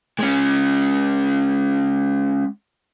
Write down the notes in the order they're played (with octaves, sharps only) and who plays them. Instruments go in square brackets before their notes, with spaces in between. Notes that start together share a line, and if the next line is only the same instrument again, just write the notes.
[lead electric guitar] G#3 C#4